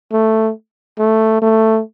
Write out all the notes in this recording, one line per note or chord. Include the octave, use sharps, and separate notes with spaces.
A3
A3
A3